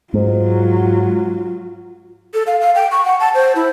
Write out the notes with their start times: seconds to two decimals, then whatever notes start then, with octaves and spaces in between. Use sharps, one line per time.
0.14 G#2 F#3 F4
2.34 A4
2.47 F5
2.61 F5
2.75 G5
2.91 C#6
3.05 F#5
3.20 A5
3.35 C5
3.55 E4